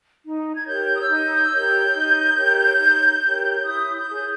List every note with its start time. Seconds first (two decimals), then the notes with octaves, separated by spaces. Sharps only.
0.24 D#4
0.54 G#6
0.66 G4 A#4 C#5 G6
0.95 D#6
1.02 E6
1.09 D#4 G6
1.33 D#6
1.43 E6
1.52 G4 A#4 C#5 G6
1.95 D#4
2.37 G4 A#4 C#5
2.80 D#4
3.23 G4 A#4 C#5
3.66 E4 D#6
3.94 G6
4.09 G#4 C#5